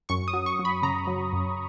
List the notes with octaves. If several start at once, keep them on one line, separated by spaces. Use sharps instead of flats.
F#2 C#6
D#6
F#3
C#6
F#3
B5
C#3 A#5
F#3
F#2